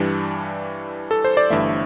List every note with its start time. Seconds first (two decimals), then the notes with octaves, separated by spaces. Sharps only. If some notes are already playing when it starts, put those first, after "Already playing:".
Already playing: G2 E3 G3 D4
1.11 A4
1.25 C5
1.37 D5
1.50 G1 G2 E3 A3 E5